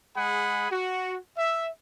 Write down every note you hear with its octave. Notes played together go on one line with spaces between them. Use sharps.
G#3 G#4 F#5 B5
F#4
E5